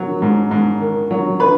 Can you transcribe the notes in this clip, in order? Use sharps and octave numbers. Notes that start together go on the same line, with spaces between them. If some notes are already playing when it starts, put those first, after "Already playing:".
Already playing: D#3 F#3
G#2
G#2
D#3
F#3
B4 B5